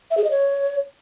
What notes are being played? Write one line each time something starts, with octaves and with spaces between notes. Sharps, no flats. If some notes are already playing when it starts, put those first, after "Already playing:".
E5
G#4
D#5
C#5